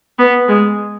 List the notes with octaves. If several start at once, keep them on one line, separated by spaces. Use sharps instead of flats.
B3
G#3